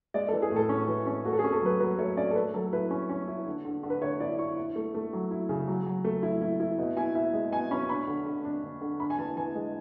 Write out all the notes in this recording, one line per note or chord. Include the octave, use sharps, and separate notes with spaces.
G#3 D5
A4
E3
G#4
A2 A4
C#4
E3
C#4
A3 F#4
A4
G#4
C#4
A4
F#3 B4
F#3 B4
A3 C#5
C#4 D5
A4
A3 B4
F#3 A4
E4 B4
C#4
C#4
E4
D3
D3
D3
B4
D3 C#5
E4 D5
E4 C#6
E4
A3
A3
F#3
E4
C#3
F#3
F#3
A3
E4
E4
E4
B2
E4 G#5
E4 E5
G#3
B2 G#5
C#4 B5
D4 B5
D3
D3
D4
D3
D3
D4 B5
G#5
E3 A5
E3 G#5
G#3